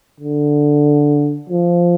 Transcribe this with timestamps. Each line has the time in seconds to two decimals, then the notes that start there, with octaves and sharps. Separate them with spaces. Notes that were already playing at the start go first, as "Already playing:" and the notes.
0.20 D3
1.49 F3